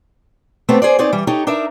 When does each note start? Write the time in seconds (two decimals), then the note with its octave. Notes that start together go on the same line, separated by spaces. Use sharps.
0.69 A3 B3 C4 G4 A4 C#5
0.82 G#4 C5 D5
0.99 C4 D#4 G#4 C#5 D5
1.12 E3 G3
1.27 D#4 G4 A4 C#5
1.47 D4 D#4 A#4 E5